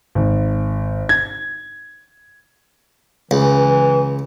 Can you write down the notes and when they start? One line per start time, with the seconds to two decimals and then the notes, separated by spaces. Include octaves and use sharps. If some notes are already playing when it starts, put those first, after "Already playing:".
0.15 G#1
1.09 G#6
3.31 C#2 E3